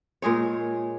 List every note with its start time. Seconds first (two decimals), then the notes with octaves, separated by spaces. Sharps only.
0.22 A#2 G#3 G#4 C#5